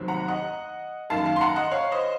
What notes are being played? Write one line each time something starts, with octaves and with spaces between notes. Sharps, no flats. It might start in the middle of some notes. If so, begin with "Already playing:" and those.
Already playing: F1 D#2 D#3 F#3 C4
F#5 A#5
D#5 F#5
F#2 D#3 A#3 F5 A5
F5 A5
C6
F#5 A#5
D#5 F#5
C#5 F5
C5 D#5